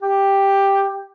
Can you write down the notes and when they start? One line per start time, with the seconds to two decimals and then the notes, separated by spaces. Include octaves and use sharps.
0.02 G4